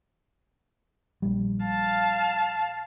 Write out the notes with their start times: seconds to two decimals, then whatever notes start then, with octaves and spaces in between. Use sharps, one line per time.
1.22 A#1 G3
1.64 F5 A5